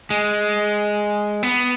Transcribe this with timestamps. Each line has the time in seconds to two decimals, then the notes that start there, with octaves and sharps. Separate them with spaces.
0.10 G#3
1.43 B3